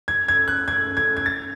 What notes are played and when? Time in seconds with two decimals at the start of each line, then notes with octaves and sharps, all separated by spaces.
0.08 G#6
0.28 G#6
0.48 F#6
0.68 G#6
0.97 G#6
1.17 G#6
1.26 A6